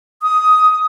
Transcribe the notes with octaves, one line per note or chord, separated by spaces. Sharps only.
D#6